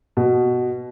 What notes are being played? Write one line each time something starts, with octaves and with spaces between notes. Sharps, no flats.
B2